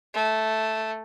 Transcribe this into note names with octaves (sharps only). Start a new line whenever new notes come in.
A3